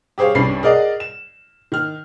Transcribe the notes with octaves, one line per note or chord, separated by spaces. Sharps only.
G4 G#4 C5 C#5 F5
C2 G2 G3 C#4 B5 C7
G#4 A#4 D5 D#5 F#5
E7
D#3 F6